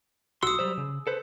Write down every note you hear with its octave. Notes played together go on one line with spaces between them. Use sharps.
B1 F#4 C6 D#6 E6
F#3 G3 C5
C#3
A4 B4 C5